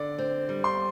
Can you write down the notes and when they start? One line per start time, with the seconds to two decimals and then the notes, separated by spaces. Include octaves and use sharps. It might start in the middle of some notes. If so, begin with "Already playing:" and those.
Already playing: D3 D5
0.18 C4
0.49 G3
0.64 C6